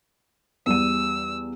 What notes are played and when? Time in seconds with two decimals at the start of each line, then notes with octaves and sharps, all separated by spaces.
0.66 E2 G3 E6 D#7